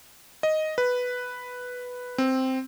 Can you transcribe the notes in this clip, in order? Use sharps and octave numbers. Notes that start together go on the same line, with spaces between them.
D#5
B4
C4